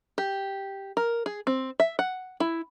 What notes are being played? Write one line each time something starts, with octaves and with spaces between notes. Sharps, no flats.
G4
A#4
G#4
C4
E5
F#5
E4